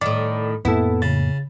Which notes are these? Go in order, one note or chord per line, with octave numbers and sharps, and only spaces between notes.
A2 D#3 D5
F2 A2 A#3 B3 E4 A4
C#3 A6